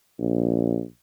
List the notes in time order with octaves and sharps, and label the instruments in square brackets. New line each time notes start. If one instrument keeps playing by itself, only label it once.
[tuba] A#1